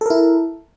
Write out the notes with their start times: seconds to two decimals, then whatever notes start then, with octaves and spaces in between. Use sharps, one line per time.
0.01 A4
0.06 A#4
0.10 E4